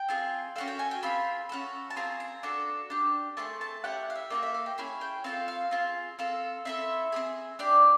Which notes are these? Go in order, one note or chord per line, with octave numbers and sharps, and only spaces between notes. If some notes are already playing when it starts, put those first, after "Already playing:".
Already playing: G5
C4 F4 G#4
C#4 F#4 A4 F5
G5
G#5
G5
C4 F4 G#4 B5
C#4 F#4 A4
A5
C4 F4 G#4 A#5
A#5
D4 F#4 A4
D4 G4
A3 C4 G#4 A5
A5
C#4 E4 G4 F#5
F5
E5
A#3 D4 F#4 A4 D#5
E5
F5
G5
C#4 E4 G#4 G#5
G5
C4 F4 A4 F5
F5
C4 F4 G#4
C4 F4 A4
C4 E4 A4 E5
C4 D#4 G#4
D4 G4 D5